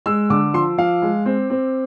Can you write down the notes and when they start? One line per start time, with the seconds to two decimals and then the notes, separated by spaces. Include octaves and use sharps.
0.06 G#3 E6
0.30 D3 D6
0.54 F3 C6
0.78 F3 F5
1.02 G#3
1.26 C4
1.50 C4